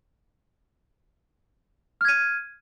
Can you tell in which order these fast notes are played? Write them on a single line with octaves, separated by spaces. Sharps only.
F6 G#6 D#7